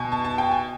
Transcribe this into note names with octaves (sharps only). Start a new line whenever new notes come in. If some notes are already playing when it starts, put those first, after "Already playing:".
Already playing: B2 G#5
A5
A5
G5
G#5